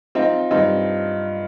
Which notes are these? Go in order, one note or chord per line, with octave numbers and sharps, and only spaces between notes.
C4 D#4 F4
G2 C4 D#4